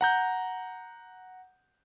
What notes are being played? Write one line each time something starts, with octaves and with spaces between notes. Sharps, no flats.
F#5 A#5 G6